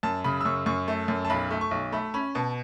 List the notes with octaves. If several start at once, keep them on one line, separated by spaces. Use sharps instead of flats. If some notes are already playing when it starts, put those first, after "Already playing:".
F#2 A5
C#3 B5
E6
F#2 C#6
F#2 C#6
A3
F#2
A5
B1 B5
A3
C#6
B1
A3 B5
C#4 B5
B2 A5